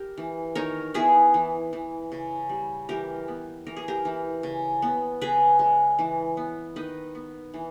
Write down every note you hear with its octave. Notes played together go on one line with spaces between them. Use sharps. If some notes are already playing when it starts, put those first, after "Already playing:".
Already playing: G4 A#4
E3
D#3 A#4 C#5
B3 E4 G#4
E3
E3
C#3
G3
E3 G4 A#4
B3
E3 A#4
G#4
G4 A#4
E3
C#3
B3
C#3 G#4 B4
G#3
E3
B3
D#3 B4 D#5
B3
E3